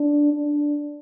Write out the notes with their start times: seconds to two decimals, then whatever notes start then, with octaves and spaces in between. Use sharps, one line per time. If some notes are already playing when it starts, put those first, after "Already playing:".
Already playing: D4
0.33 D4